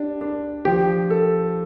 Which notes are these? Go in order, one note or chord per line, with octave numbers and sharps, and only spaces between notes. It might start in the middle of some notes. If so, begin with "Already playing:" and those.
Already playing: D4 G4
D4
F3 G4
A4